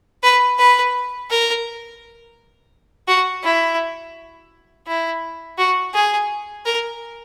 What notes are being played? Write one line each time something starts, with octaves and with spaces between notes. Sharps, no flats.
B4
B4
A#4
F#4
E4
E4
F#4
G#4
A#4